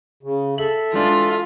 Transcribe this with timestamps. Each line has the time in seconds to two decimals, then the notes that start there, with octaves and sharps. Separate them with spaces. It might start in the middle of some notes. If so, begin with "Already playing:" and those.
0.23 C#3
0.58 A4 E5 F#7
0.93 E3 G#3 D4 F4